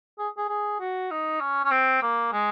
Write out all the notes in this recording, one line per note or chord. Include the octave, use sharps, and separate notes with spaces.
G#4
G#4
G#4
F#4
D#4
C#4
C#4
C4
A#3
G#3